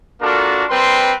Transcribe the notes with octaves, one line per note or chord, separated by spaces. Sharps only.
A#3 D4 F4 F#4 A4 A#4
G3 C4 A#4 B4 C6